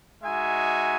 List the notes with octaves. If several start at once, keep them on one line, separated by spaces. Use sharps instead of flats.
G#3 D#4 F#4 E5 G#5